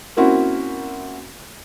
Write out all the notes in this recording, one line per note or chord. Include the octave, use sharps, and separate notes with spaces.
A#3 C4 C#4 E4 F#4